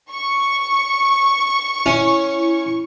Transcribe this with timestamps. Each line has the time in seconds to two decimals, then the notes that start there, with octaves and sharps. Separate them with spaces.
0.12 C#6
1.86 C#4 E4